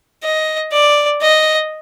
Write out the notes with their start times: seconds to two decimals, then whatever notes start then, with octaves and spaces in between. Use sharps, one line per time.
0.23 D#5
0.73 D5
1.22 D#5